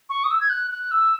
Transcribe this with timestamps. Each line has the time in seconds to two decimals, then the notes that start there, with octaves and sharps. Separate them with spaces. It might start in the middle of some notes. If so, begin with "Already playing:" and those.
0.10 C#6
0.24 D#6
0.31 E6
0.41 G#6
0.50 F#6
0.71 F#6
0.91 E6